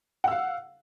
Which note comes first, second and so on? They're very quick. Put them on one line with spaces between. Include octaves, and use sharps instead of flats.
F#5 E6 F5